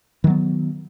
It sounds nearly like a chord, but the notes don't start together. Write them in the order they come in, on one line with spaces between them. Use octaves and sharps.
D#3 F#3 B3